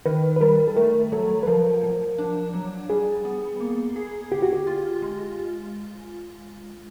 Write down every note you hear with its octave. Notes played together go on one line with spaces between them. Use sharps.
D#3 B4
B4
G3 A#4
A4
A3 A#4
F#3 A4
B4
F3 A#4
F3
D4
F#3
G3 G#4
B3
A#3
G#4
D3 G4
F#4
G4
F4
G#3